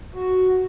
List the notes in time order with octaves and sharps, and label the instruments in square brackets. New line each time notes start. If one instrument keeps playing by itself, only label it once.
[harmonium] F#4